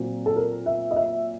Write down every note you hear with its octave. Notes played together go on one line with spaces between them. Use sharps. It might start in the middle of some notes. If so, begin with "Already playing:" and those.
Already playing: A#2 F#3 C4
A4
A#4
E5
D#5
E5